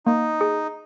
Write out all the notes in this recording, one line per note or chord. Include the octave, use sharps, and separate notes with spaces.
A#3 D#4
G#4